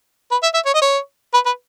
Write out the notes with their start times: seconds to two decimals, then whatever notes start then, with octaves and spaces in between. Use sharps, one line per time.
0.31 B4
0.43 E5
0.54 E5
0.65 C#5
0.74 D#5
0.82 C#5
1.34 B4
1.46 B4